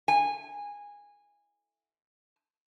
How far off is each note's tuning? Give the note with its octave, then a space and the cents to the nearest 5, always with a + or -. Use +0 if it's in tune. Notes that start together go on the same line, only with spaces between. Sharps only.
G#5 -15